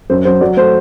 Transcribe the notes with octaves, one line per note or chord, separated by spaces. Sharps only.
F#2 C5
F#3 C5
F#3 D5
A3 C5